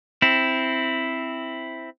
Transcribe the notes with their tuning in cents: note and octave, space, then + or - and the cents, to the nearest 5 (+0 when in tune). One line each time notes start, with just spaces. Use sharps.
C4 +0 E4 +0